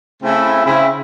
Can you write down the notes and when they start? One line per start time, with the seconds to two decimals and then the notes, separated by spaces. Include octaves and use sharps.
0.23 C#3 A3 C4 E4
0.65 C#3 C4 E4